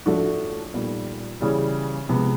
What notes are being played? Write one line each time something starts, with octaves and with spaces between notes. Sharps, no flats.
A2 F3 A3 D4 F#4
A#2 G3 B3 D#4
C#3 E3 G3
C3 F3 G#3 B3